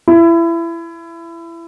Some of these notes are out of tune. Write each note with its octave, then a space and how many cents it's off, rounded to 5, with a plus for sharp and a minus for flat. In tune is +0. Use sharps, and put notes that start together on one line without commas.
E4 +25